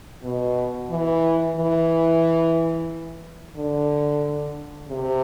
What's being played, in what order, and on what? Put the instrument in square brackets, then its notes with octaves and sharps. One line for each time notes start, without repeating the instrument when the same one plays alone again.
[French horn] B2
E3
E3
D3
C3